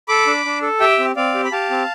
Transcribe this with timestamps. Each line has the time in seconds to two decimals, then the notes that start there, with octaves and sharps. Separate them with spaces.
0.08 A4 B5 D6
0.27 D4
0.45 D4
0.62 A4
0.80 G4 E5 G5
0.99 C4
1.16 C4 D5 F5
1.35 G4
1.44 B5
1.52 G4 F5 A5
1.70 C4